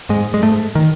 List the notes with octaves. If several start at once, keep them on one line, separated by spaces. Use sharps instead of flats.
G#2 G#3
G#3
G#2 A3
D#3